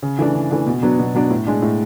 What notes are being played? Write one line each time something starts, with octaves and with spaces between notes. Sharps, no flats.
C#3
E3 A3 D4
C#3
E3 A3 D4
B2
F#3 B3 D4
B2
F#3 B3 D4
A2
G#3 D4
A2